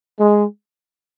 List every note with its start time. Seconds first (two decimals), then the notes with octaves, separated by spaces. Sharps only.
0.19 G#3